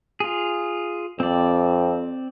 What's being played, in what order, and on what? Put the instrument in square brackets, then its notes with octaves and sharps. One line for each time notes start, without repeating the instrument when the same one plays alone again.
[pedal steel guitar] F4 G#4
[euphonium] F2 [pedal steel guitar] C4 D5